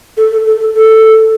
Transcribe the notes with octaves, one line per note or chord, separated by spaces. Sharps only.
A4
A4
A4
A4
A4